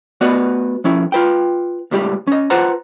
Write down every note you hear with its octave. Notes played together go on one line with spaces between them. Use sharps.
A3 B3 F#4 B4 D5 D#5
F3 C#4 E4
F4 B4 G5
C#2 A2 G3 G4
C#4 D#5
F4 B4 C5 F#5 A5 A#5